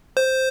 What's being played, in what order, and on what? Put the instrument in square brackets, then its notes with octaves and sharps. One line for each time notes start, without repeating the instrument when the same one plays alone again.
[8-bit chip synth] C5